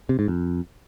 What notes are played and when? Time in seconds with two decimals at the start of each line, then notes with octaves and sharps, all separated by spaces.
0.09 C3
0.19 G#2
0.28 F2